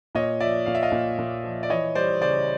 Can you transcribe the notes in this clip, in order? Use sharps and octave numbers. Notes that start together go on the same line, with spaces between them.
A#2 C#5 D#5
F3 D5 E5
A#2 F5
E5
D#5 F5
A#2
A#2
F3
D5
E3 C#5 D#5
G3 C5 D5
C#3 C5 D5